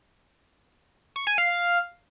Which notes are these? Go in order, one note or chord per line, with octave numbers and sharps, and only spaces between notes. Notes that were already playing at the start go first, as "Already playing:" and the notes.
C#6
G#5
F5